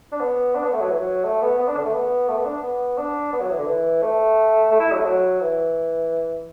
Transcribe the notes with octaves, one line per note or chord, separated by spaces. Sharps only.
D4
B3
D4
B3
A3
F#3
E3
F#3
A3
B3
B3
D4
D3
A3
B3
A3
B3
D4
B3
D4
B3
F#3
E3
D3
E3
A3
A3
E4
F#3
A3
F#3
E3